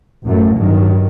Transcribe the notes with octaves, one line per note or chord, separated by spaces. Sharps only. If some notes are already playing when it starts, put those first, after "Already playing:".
A1 F#2 F#3 A3
G2 D#3 F#3